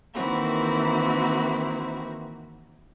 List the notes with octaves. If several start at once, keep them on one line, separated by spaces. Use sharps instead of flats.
D#3 E3 A#3 C4 E4 F#4